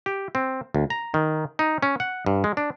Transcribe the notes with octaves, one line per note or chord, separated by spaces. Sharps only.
G4
C4
D2
A#5
D#3
D#4
C#4
F#5
G2
G#3
D4